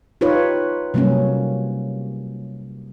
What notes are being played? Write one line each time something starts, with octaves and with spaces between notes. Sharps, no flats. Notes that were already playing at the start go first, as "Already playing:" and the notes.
D#4 F4 G4 B4 C#5
C3 F#3 G3 A#3 C#4